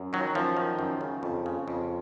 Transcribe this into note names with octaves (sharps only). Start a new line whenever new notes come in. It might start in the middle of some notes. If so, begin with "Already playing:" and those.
Already playing: F#2
D#3 F#3
F#2 F3
D#3
F#2
C#3
F2
C#3
F2